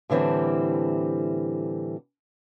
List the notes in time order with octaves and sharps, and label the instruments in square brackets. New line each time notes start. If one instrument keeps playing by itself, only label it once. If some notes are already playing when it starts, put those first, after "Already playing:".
[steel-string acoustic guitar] A2 D3 E3 G3 C4